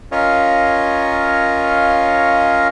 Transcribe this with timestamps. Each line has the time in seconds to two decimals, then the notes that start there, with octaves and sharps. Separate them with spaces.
0.12 C#4 F4 A#4 C#5 D#5 F5